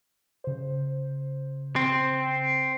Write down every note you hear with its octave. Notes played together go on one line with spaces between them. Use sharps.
C#3 C5
C4